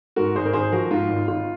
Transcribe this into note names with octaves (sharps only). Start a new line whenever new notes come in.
G#2 F#4 A#4
G#1 G#4 C5
A#4
G#1 G#4 C5
F3 F#4 A#4
G#2 F4
G#1
G#1 F4